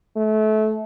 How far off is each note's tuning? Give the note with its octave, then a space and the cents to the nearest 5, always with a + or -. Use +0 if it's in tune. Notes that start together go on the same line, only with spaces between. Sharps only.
A3 -25